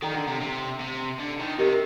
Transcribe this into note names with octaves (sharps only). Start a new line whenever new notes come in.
D#3 A4 D5 G5 A#5
D3
C3
C3
C3
D3
D#3
C3 G4 A#4 D#5